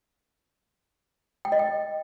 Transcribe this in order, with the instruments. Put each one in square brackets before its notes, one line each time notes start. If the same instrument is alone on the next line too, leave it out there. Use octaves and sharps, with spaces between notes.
[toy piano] G5
D#5
G5